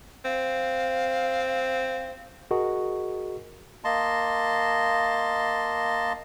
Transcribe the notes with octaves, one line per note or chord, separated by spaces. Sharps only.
C4 F5
F#4 G#4 A#4 D#5 F#5 C#6
A#3 D#5 A5 C6